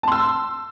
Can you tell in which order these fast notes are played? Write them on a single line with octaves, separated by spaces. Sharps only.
A5 C6 E6